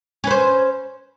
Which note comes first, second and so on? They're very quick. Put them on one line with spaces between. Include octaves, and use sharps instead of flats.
C#4 B4 C5